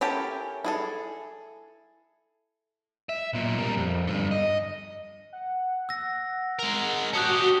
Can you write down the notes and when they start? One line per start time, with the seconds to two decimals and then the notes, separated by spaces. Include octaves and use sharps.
0.01 C#4 E4 G4 A4 A#4
0.65 E4 G#4 A4
3.09 E5
3.33 B1 A#2
3.59 G3 A#4
3.77 F2
4.07 G2 D3
4.31 D#5
5.33 F#5
5.89 E6 A#6
6.59 G#3 A#4
7.13 C#4 F#4 G4 A5 D#6 F#6 G6